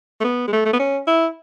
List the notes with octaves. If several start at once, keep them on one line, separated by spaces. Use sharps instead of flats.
A3
B3
G#3
A3
A3
B3
C#4
E4